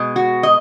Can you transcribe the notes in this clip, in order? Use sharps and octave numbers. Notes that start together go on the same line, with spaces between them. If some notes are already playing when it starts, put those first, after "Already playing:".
Already playing: B2 G#3
F#4
D#5